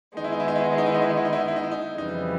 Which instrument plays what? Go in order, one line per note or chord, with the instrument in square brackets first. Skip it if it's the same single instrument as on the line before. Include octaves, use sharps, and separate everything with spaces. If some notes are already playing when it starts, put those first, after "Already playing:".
[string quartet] D#3 G#3 B3 [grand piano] D#4
[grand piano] E4
D#4
E4
D#4
E4
D#4
E4
D#4
E4
D#4
E4
D#4
E4
D#4
E4
D#4
E4
D#4
E4
D#4
[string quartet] F2 C#3 E3 G3 [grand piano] D#4